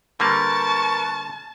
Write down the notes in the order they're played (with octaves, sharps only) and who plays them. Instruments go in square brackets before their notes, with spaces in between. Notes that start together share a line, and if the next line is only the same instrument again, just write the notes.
[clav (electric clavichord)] D3 G3 A#3 [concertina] A#4 B4 [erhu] A5 [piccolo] C#6